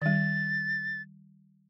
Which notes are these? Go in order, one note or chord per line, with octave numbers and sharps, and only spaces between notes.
D#3 G3 A6